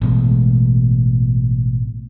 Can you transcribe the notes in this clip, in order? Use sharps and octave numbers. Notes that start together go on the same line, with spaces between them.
A1 B2 G#3